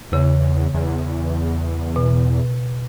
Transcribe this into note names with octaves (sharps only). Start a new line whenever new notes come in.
E2 C#3
E2
B2